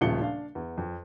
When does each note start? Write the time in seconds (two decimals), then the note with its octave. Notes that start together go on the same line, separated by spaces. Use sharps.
0.01 D#1 A1 C#3 F3 C#7 G7
0.21 D4 F5
0.55 E2
0.77 F2